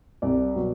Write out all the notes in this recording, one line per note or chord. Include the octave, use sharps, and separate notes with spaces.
C2 D5
B2 F#3